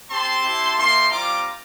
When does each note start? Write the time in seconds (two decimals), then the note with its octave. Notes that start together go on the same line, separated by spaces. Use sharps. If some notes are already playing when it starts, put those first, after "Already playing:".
0.10 C4 G4 A5 C6
0.42 C4 E4 G4
0.76 A#3 E4 G4 A5 C6
1.10 G3 C4 F4 A#5 D6